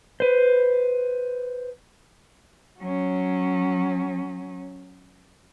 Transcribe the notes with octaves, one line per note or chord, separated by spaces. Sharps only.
B4 C5
F#3 C#4